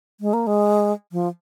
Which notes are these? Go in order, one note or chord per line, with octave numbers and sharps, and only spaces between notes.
G#3
A#3
G#3
F3